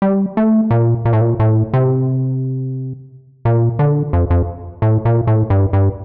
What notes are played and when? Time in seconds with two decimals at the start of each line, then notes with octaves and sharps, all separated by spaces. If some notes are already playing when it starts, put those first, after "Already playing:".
0.02 G3
0.37 A3
0.71 A#2
1.05 A#2
1.13 A2
1.21 A#2
1.39 A2
1.73 C3
3.45 A#2
3.79 D3
4.13 F2
4.30 F2
4.82 A2
5.05 A#2
5.27 A2
5.50 G2
5.73 G2